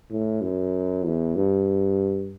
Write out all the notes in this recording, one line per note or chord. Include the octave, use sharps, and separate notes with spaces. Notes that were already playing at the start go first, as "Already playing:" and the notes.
A2
F#2
E2
G2